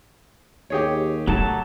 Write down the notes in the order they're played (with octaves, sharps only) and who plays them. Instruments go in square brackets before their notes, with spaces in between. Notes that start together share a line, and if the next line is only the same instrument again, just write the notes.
[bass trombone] D#2 [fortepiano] G4 G#4 C#5
[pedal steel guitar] F#3 A4 A5 [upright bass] A3